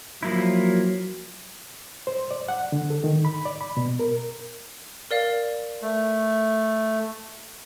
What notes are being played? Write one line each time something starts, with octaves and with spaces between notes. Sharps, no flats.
F3 F#3 A#3 E4
C5
D5
F#5
D3
A4
D#3
B5
D5
B5
B2
A#4
A#4 D5 F5
A3